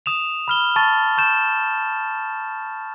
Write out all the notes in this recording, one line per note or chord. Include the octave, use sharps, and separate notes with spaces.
D#6 E7 F7
B5 F6 G7
A5 C#6 A6
C#6 G6 E7